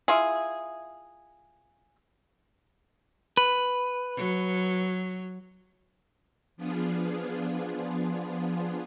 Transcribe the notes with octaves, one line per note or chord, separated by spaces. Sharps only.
E4 F4 G#4
B4
F#3
F3 B3 D4 F4 G#4